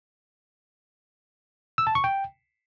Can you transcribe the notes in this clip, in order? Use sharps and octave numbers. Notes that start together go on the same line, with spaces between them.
E6
A5
C#6
G5